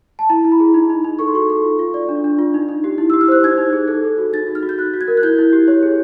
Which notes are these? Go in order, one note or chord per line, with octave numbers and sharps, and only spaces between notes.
A5
E4 A#5
E4
B5
G#4
D#4
D#4
D#4
A4 C#6
C6
F#4 C#6
A4
F4
F4
D5
D4
D4
F4
D#4
D#4
G4
E4
E6
G4
F6
C5 F#6
D#4 G#6
D#4
G#4
A4
A4
F#4
D#4 A6
F#4
F6
F#4
G6
F#4 F#6
F#4
G#6
A#4
F#6
E4 G6
E4
G4
C#5
G#4